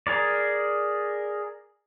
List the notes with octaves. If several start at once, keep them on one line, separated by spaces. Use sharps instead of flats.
G#4 A#4 D5